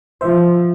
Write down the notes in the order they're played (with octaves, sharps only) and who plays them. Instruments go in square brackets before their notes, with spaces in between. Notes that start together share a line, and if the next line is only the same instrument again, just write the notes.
[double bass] F3 [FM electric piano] C5 E5